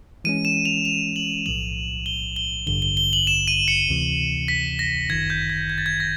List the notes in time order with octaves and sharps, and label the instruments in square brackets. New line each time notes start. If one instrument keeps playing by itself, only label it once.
[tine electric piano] E3 G#3 C#4 [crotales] D#7
[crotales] E7
F7
F7
F#7
[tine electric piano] B1 A2 F3 [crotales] F#7
[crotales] G7
G7
[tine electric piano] A1 G2 D3 [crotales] G7
[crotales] G7
G7
F#7
E7
D#7
C#7
[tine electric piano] D2 C3 E3
[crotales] B6
A#6
[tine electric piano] G1 F#2 D#3 [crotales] G#6
[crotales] G6
G#6
G#6
A6
G#6
A#6